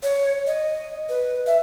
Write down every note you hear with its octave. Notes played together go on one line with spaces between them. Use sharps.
C#5
D#5
B4
E5